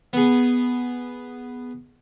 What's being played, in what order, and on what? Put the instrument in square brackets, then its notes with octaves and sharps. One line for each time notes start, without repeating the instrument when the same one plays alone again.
[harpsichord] B3 G#4